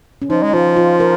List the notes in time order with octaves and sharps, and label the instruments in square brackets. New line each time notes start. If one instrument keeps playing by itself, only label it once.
[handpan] C#4
[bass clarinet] F3 [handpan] D#4
[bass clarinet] G#3
[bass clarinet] F3 [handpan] F4
[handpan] F4
A#4